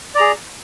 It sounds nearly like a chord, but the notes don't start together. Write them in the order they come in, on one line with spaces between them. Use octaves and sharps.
D5 A#5 G#4